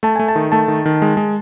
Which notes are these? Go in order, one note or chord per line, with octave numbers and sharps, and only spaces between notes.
A3 A5
A3 G#5
A5
D#3
A3 A5
D#3
D#3
G#3
G#3